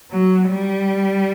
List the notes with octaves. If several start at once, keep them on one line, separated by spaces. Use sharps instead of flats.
F#3
G3